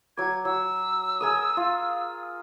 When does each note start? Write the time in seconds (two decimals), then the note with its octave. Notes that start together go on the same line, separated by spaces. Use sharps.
0.17 F#3 D6 G#6
0.45 F#3 E6
1.21 G#4 A#4 D#6
1.57 F4